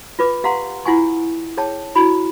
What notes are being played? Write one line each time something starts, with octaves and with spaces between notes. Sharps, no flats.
F4 B4 D6
G4 F5 F#5 A#5 C6
E4 F4 F#5 G#5 C#6
G#4 C#5 G5 A5
E4 F#4 B5